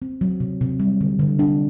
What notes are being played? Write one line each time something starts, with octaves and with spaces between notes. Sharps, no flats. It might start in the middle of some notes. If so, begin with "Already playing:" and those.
C4
F#3
C3
C3
G3
D3
D3
D4